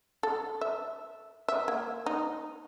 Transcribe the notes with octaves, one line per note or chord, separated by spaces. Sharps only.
A4
E5
E5
A#3
D#4